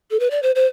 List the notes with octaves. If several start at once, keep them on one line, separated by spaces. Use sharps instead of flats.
A4
B4
D5
C5
C5